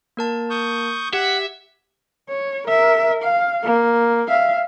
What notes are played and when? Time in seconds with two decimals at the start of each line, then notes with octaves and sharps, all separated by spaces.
0.17 A#3 A#4 A5
0.50 C#6 D#6 G6
1.13 G4 E5 F#5
2.29 C#5
2.68 A#4 E5
3.24 F5
3.63 A#3
4.28 E5 F5